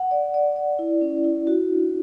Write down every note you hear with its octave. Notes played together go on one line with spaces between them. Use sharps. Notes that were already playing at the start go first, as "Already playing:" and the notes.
Already playing: F#5
D5
D5
D5
E4
C#4
E4
F#4
D4